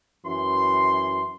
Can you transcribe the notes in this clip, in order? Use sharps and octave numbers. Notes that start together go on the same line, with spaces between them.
F#2 E3 C6